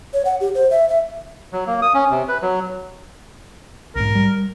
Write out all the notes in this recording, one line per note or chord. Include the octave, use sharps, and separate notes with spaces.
C#5
F#5
G4
C5
E5
E5
F#3
A#3
D#6
C#4
C3
B4
F#3
B1 G#2 A#4
G3